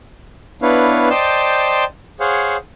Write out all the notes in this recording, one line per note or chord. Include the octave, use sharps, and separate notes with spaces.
B3 D4 E4 B4 C#5 F5
C5 D5 D#5 G5 A5 C6
G#4 C5 C#5 F5 F#5